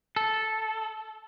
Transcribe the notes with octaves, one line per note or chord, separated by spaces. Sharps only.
A4